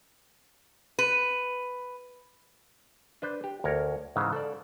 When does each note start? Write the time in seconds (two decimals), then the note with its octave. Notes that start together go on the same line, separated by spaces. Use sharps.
0.99 B4
3.22 D4 B4 C5
3.44 G4
3.64 D2 A#4 C#5
4.16 G#2 C#3 E3
4.33 A4 C5 D5